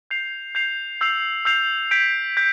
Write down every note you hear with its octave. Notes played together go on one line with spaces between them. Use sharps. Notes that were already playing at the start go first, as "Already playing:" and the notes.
G6 C7 F7
G6 C7 F7
E6 G6 C7 F7
E6 G6 C7 F7
G6 B6 D7
G6 B6